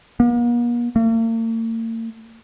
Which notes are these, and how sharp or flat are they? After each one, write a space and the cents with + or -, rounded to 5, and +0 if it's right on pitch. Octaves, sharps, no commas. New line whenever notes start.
A#3 +45
A#3 -45